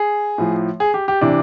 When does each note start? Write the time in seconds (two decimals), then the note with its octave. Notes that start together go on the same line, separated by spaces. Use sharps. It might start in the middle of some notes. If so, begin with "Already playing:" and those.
Already playing: G#4
0.38 A2 F3
0.80 G#4
0.94 G4
1.08 G4
1.21 C3 E3 D4